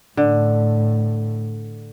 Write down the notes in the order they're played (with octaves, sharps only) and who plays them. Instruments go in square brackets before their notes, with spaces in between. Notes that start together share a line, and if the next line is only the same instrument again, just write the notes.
[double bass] A2 [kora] D3